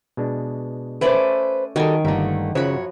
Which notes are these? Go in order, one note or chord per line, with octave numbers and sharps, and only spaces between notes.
B2 G#3 D4
A3 C#4 B4 C5 D5
D#3 G3 F#4 A4 D#5 G5 G#5
G1 D3 A3 A#3 A#5
F#2 C#3 F3 F#4 C#5 B5